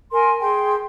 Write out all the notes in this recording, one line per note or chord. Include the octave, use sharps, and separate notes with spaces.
A#4 G#5 C6
G#4 G5 C6